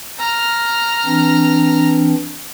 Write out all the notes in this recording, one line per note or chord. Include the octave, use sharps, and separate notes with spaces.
A#5 F6
E3 C4 D4